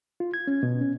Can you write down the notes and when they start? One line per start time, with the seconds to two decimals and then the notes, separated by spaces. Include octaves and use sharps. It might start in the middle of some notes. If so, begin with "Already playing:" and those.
0.20 F4
0.34 G#6
0.47 C#4
0.63 B2
0.81 C#4